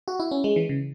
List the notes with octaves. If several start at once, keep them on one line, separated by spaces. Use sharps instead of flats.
F#4
E4
C#4
G#3
E3
C#3